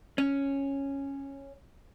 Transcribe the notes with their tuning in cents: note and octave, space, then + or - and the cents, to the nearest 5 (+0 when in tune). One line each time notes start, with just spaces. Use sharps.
C#4 -5